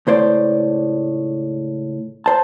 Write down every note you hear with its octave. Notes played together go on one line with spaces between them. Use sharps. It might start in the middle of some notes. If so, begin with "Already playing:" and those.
C#2 A2 C5 D5
C5 A5